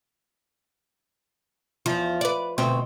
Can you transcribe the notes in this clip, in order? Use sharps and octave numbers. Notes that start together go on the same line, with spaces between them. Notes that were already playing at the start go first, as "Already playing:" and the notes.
E2 F3
B4 D5
D2 B2 C4